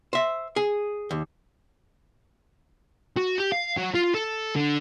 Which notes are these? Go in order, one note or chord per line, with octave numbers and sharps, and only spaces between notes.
C5 E5
G#4
D#2
F#4
G4
F5
F#3
F4
A4
D3